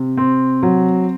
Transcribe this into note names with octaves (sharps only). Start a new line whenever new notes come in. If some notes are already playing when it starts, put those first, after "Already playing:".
Already playing: C3
C4
F#3